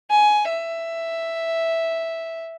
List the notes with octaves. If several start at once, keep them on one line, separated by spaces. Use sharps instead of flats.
G#5
E5